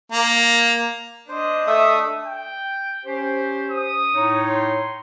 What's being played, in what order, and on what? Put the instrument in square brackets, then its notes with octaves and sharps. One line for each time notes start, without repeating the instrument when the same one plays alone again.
[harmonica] A#3
[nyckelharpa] D4 D#5 [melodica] C5
[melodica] A3 A4 D#6 [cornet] E5
[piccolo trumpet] G5
[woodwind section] C#4 G4 C5
[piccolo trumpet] D#6
[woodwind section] A2 D#4 C#5
[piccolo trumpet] C6